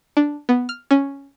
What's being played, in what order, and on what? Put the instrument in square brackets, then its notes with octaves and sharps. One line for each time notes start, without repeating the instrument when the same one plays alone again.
[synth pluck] D4
B3
F6
C#4